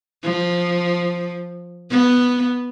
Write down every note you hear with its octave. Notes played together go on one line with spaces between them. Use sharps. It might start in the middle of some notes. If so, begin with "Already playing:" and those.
F3
B3